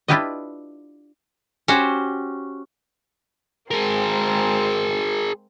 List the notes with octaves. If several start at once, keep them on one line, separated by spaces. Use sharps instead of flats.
D4 E4 F4 G4 B4 D#5
C#4 F#4 G4 C5
G#3 A#3 C4 G#4 A#4